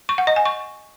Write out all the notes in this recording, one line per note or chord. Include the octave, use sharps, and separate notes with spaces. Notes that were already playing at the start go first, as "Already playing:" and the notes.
C#6
F#5
D#5
G#5
C#6